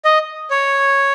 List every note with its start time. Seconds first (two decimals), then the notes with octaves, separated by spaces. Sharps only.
0.05 D#5
0.50 C#5